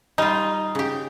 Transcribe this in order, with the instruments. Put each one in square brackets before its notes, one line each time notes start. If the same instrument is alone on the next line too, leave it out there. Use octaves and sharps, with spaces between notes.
[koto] G3 F4 [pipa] D#4
[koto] C#3 G4